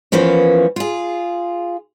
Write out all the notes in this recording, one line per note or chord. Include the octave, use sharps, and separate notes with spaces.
E2 E3 F3 A#3 C#4
F4 G#4